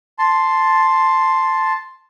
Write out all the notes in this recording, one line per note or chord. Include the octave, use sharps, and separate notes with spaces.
A5 C6